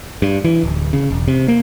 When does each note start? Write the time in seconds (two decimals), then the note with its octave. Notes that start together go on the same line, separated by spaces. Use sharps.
0.22 G2
0.45 E3
0.63 D1
0.93 C#3
1.11 E1
1.28 C3
1.48 A#3